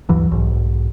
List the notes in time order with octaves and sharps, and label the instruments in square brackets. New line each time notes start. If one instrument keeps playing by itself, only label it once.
[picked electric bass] D2 G2 E3 F#3
B1 G#2